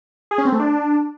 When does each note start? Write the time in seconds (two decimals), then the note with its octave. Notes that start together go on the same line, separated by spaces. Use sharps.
0.31 G#4
0.38 C#4
0.45 C4
0.52 A3
0.59 D4